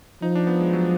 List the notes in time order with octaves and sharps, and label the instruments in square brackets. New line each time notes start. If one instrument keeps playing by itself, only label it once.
[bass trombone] F3 [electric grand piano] D#4
[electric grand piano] D4
B3
G#3
F#3